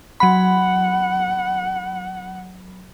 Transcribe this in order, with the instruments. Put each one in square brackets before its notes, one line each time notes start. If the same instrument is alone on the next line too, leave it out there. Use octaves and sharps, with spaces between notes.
[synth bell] F#3 B5 [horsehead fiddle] F#5